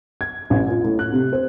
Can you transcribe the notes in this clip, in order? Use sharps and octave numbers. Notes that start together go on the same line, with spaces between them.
G#6
A1
F4
A2
F#6
C3
C5